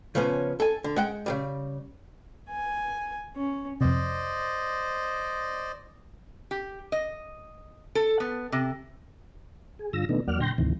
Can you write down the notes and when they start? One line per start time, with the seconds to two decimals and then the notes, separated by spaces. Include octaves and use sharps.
0.15 C#3 F3 B3 C#4
0.60 A4 G#5
0.84 D3
0.96 G#3 F#5 G5
1.26 C#3 E3 G3
2.50 G#5
3.36 C#4
3.81 F2 C3 C5 D5 D#5
6.51 G4
6.92 D#5
7.95 A4
8.20 B3
8.52 C3
9.79 G#4
9.93 G2 D3 F4 E6 A#6
10.09 B2 D#3 A3 B3 D4 D#4
10.28 E2 F#3 A#3 D5 F#5 F6
10.40 A#2 D3 G5 C6 G6 A#6
10.58 D2 G#2 C3 D#3 E3